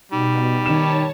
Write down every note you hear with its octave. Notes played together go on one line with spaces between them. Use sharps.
B2 G3 D#4
D#3 C#5 A5 E7